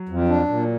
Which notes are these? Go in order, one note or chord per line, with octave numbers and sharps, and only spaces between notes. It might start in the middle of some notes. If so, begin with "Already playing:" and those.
Already playing: F#3
F2
D4
A#2